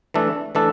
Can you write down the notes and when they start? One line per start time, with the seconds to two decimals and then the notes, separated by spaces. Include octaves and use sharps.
0.14 E3 A3 D4 A4
0.55 E3 A3 D4 A4